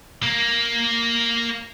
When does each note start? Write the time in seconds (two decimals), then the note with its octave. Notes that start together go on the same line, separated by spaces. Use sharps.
0.23 A#3 A#4